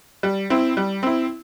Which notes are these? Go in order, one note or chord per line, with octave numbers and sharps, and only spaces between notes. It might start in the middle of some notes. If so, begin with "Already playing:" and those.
G3
C4 E4
G3
C4 E4